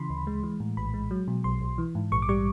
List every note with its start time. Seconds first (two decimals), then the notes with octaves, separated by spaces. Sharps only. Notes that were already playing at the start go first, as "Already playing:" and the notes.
Already playing: C#3 E3 B5 C6
0.10 D2
0.27 G#3
0.43 E3
0.60 A2
0.77 A#1 B5
0.94 G#3
1.11 F#3
1.28 B2
1.44 B1 C6
1.61 B1
1.78 E3
1.95 G#2
2.12 A#1 C#6
2.22 D6
2.29 G3 C#6